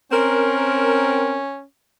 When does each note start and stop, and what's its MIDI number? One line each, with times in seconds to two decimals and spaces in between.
0.12 1.40 60
0.12 1.63 61
0.12 1.40 70